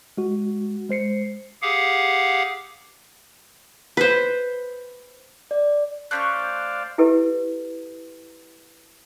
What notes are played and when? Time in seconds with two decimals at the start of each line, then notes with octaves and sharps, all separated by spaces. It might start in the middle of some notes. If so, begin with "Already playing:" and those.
0.17 G#3 F#4
0.89 G#3 C5 C7 C#7
1.62 G4 G#4 F5 F#5
3.97 B4 C5
5.51 D5
6.11 A3 C#4 C5 D5 F5 C#6 F#6 G6
6.98 E4 G4 A4 B4